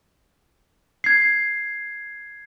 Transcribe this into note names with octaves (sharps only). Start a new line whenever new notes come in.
G#6 C7